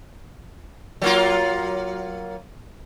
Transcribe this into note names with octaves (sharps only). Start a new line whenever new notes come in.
F#3 A#3 F4